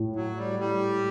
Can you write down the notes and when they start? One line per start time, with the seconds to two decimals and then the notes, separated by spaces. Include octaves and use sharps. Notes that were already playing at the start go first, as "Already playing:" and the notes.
Already playing: A2
0.16 F#3
0.38 G3
0.59 G3